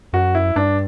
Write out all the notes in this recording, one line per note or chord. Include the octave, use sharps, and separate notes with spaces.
F#2 F#4
E4
G2 D4